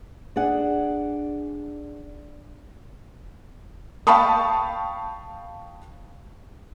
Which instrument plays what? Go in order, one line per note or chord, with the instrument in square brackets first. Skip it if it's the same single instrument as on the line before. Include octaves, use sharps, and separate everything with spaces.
[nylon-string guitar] D4 G#4 F#5
[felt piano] F5 G5 A5 B5 C#6 D#6